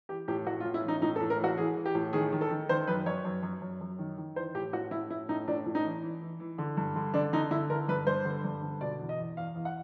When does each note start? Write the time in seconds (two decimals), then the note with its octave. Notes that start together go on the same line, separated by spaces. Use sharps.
0.09 E3 G4
0.28 A2 G4
0.46 A2 F#4
0.60 F4
0.65 A2
0.74 E4
0.83 E3 D#4
1.02 A2 D#4
1.16 A4
1.20 A2
1.30 A#4
1.39 E3 F#4
1.58 E3 G#4
1.76 E3
1.85 G4
1.95 A2
2.13 D#3 G#4
2.32 D#3
2.41 A4
2.51 D#3
2.69 D#3 C5
2.87 F#2 B4
3.06 F#2 C#5
3.25 F#2
3.43 F#2
3.62 F#2
3.81 F#2
3.99 D#3
4.18 D#3
4.36 E3 C5
4.55 A2 G4
4.73 A2 F#4
4.91 A2 E4
5.10 A2 E4
5.29 A2 D#4
5.47 A2 D4
5.66 A2
5.75 D#4
5.84 E3
6.03 E3
6.21 E3
6.40 E3
6.58 D3
6.77 G2
6.95 D3
7.14 D3 D4
7.33 D3 D#4
7.51 D3 E4
7.69 D3 A#4
7.88 G2 B4
8.07 G2 C5
8.25 D3
8.44 G2
8.63 D3
8.81 B2 D5
9.00 E2
9.09 D#5
9.18 E2
9.37 E2 F5
9.55 E2
9.65 F#5